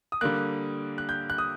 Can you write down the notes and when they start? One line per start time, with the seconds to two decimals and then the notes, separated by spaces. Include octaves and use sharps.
0.12 D#6
0.21 D3 G3 A#3 F#6
0.98 F#6
1.09 G6
1.30 F#6
1.38 D#6